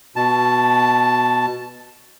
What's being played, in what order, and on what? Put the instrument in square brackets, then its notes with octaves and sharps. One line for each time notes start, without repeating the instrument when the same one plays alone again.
[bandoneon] B2 A5